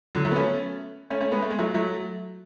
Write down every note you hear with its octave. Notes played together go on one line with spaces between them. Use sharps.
D3 F#3
F#3 A3
B3
A3 C#4
A3 C#4
A3 C#4
G#3 B3
A3
G#3
F#3 A3
F#3 A3